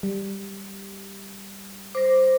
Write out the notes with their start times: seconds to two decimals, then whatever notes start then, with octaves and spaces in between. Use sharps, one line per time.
0.03 G3
1.95 C5 D6 A#6